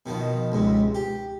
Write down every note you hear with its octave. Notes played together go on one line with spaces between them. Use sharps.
B2 D#3 F3
C#2 G#2 C3
G4